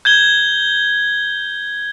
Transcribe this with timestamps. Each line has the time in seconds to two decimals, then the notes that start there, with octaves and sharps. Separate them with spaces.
0.05 G6 G#6 G7